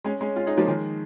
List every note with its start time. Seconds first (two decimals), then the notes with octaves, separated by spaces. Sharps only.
0.04 G#3 C#4
0.21 G#3 C#4
0.36 C#4 F4
0.46 D#4 G#4
0.57 F3 A#3
0.67 D#3 G#3